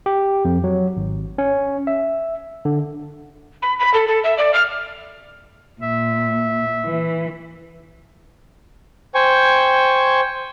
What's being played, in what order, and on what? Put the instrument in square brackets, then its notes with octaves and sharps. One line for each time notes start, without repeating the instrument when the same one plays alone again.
[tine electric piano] G4
F2
F#3
G#1
C#4
E5
D3
[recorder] B5
B5
A4
A4
E5
D5
F6
[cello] A#2 [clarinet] E5
[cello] E3
[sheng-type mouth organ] C5 G5 G#5 C#6